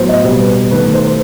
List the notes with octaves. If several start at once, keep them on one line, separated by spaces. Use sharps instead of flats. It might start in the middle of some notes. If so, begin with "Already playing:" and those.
Already playing: A2 F#3 B3 C5
D#5
B2 G3 B3 C5
B4
D#3 A3 B4
C5
C5